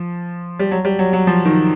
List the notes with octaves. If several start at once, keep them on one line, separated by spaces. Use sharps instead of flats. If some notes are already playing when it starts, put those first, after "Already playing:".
Already playing: F3
G3
F#3
G3
F#3
F#3
F3
D#3